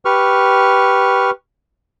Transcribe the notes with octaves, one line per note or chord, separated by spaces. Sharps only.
G4 B4 C#6 F6